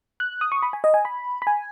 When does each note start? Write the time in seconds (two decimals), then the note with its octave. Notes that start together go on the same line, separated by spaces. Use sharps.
0.20 F#6
0.41 D#6
0.52 C#6
0.63 B5
0.73 G#5
0.84 D#5
0.94 G#5
1.05 B5
1.42 B5
1.47 G#5